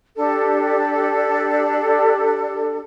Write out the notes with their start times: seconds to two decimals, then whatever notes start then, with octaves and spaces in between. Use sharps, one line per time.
0.17 D4 G4 A4 D5